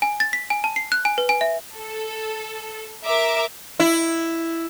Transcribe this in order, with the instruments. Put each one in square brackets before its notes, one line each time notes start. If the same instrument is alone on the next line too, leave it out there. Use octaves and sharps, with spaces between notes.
[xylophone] G#5
A6
B6
G#5
A5
C7
F#6
G#5
B4
G#5
E5
[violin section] A4
A#4 E5 A#5 D6
[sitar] E4